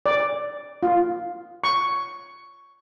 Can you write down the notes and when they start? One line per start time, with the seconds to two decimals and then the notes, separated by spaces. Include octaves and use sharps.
0.06 D5
0.83 F4
1.64 C#6